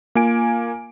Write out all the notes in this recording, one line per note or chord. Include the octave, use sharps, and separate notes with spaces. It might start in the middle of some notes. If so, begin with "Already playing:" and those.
A#3 F4 G#5 D7